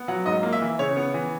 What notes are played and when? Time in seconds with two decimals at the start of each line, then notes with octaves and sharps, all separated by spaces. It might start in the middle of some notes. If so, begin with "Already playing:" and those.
Already playing: B3
0.08 F#3 F#5
0.26 G#2 D#5
0.43 A#3
0.53 E5
0.61 E3
0.79 C#3 C#5
0.96 B3
1.14 E3